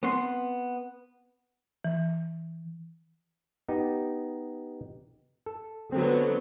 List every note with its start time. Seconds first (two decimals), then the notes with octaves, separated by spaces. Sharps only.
0.03 B3 C4 B4 C6
1.84 E3
3.68 B3 D#4 G4
5.46 A4
5.92 D3 F#3 B3 C4 A4